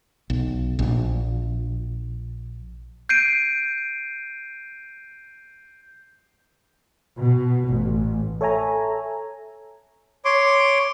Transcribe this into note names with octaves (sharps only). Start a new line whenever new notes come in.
B1
A#1
G6 C7 D7 D#7
B2
A1
A4 C#5 E5 G#5 A#5
C#5 C6 D6